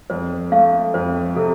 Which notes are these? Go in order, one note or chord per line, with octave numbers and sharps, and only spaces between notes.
F2 C5
A3 F5
F2 C5
C3 A4